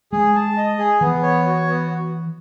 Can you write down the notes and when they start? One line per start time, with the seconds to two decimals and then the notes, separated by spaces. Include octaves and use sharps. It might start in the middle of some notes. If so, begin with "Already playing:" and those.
0.12 G#3 G#4
0.35 A5
0.57 D#5
0.78 G#4
1.01 E3 B3
1.23 C#5
1.46 F#4
1.68 B3